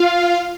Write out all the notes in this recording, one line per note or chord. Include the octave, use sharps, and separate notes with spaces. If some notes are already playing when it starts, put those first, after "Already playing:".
Already playing: F4 F5